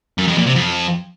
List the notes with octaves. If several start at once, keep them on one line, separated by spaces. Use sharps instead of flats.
F#2
F2
A#2
C3
F2